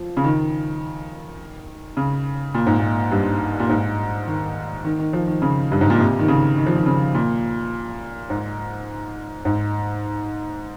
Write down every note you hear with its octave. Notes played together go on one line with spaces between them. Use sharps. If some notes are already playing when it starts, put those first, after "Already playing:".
Already playing: F3
C#3
D#3
C#3
A#2
G#2
A#2
G2
A#2
G#2
D#3
D#3
D#3
F3
D#3
C#3
G2
G#2
A#2
C3
D#3
C#3
D#3
F3
D#3
C#3
A#2
G#2
G#2